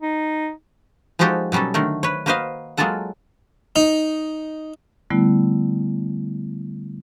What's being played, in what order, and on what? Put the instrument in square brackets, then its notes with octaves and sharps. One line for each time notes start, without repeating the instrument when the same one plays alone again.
[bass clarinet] D#4
[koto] F3 G#3 D#4 F#4 G4 A4
B2 F#3 G3 C#4 A4
D3 D#3 A3 A#4
B4 C#5
A#3 F#4 B4 C5 D#5 F5
F#3 G#3 A#3 F4 A4 F#5
[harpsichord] D#4
[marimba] D3 G3 A3 B3 E4